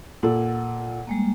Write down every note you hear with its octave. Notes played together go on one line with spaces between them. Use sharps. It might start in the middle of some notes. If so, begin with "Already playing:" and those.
A#2 A4 F#5
G3 G#3 A#3